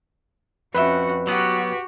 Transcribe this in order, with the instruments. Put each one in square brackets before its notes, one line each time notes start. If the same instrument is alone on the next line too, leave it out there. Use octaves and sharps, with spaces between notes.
[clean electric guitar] F2 [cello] C#4 F#4 [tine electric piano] B4 [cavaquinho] E5 G5 B5
[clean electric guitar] F#3 B3 [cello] F#4 G4